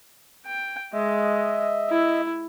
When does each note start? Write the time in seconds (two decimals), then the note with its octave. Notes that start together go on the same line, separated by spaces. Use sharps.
0.47 G5
0.93 G#3 D#5 E5
1.89 E4